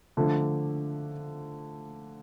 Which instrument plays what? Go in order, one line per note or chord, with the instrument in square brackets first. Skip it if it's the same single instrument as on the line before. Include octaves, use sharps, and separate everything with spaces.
[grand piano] D3 F3 A3